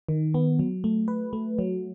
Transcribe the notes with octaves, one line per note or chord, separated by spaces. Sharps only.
D#3
B3
F#3
A3
B4
A3
F#3